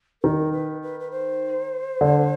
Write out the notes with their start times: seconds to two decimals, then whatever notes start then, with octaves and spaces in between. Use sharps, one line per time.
0.23 D#3 A#4
0.53 B4
0.82 B4
1.00 B4
1.11 C5
2.01 D3